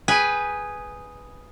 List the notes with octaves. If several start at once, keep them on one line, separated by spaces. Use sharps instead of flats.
G#4 B4 G5 G#5